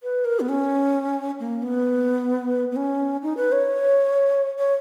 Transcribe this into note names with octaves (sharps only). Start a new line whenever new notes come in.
B4
A#4
B3
C#4
A#3
B3
B3
C#4
D#4
B4
C#5
C#5